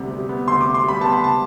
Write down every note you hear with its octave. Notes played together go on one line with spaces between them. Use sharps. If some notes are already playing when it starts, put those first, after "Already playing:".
Already playing: D2 C3 G3 B3
G3
B3
D2 C6
D6
C3
C6
G3 B5
B3 A5
B5
D2 A5